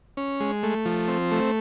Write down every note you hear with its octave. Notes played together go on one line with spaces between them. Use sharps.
C#4
G#3
A3
F3
C4
A3